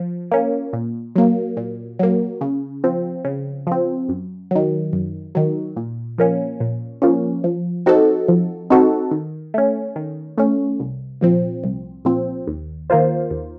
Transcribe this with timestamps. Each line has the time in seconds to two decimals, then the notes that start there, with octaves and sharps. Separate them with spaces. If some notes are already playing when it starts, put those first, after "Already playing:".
Already playing: F3
0.31 A#3 C#4
0.73 A#2
1.16 F#3 A#3
1.57 A#2
1.99 F#3 A#3
2.41 C#3
2.84 F3 C4
3.25 C#3
3.67 F3 C4
4.09 F#2
4.51 D#3 F#3
4.93 F#2
5.35 D#3 F#3
5.76 A#2
6.18 F3 A#3 C#4
6.60 A#2
7.02 F3 A#3 C#4
7.44 F3
7.86 C4 D#4 F#4 A4
8.28 F3
8.70 C4 D#4 F#4 A4
9.11 D#3
9.54 A3 C#4
9.96 D#3
10.38 A3 C#4
10.80 C2
11.21 A#2 F3 C4
11.64 C2
12.05 A#2 F3 C4
12.47 D#2
12.90 D#3 A#3 F4 C5
13.31 D#2